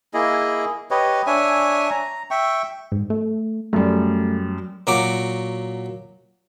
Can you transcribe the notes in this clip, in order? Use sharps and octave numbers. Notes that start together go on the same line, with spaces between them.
A#3 E4 G#4 D#5
G4 B4 C#5 D#5
D4 C#5 E5 G#5
A#5
E5 G5 C#6
G#2
A3
F#2 G3 A3
A#2 F#3 F#4 D6